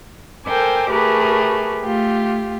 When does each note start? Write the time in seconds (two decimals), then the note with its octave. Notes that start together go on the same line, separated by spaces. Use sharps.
0.46 A4 A#4 C5 G5 G#5 D6
0.91 A3 G4 G#4 A#4 B4
1.83 A3 F4 G4